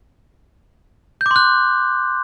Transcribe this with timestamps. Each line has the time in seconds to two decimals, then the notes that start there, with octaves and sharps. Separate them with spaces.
1.21 G6
1.26 D6
1.31 C6
1.36 F#6